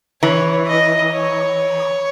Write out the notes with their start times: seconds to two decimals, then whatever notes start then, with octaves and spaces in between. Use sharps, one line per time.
0.22 E3 C#5
0.68 D#5
1.14 C#5